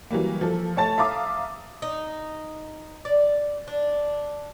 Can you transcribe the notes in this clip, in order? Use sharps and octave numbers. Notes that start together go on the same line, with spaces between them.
E3 F#3 G3 A#3
F3 A4
A3 C#5 A5 A6
E5 F5 A#5 D6 D#6
D#4
D5
D4